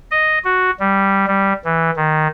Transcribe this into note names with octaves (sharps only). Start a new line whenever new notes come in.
D#5
F#4
G3
G3
E3
D#3